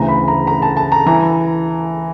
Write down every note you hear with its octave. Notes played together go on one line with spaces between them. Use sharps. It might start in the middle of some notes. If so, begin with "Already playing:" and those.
Already playing: D2 C#3 E3 A#5
B5
A#5
A#5
A5
A5
A#5
E3 A#5